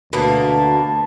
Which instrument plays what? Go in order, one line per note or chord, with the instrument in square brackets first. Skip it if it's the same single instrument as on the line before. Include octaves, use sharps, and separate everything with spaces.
[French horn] D2 [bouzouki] B2 A#3 [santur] B4 [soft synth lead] A5